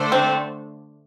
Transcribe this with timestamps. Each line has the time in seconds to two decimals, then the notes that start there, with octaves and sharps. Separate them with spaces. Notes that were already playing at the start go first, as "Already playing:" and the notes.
Already playing: D3 A3 D4 A4 C5
0.12 C4